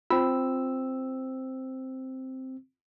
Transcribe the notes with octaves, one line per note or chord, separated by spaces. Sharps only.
C4 F4 E6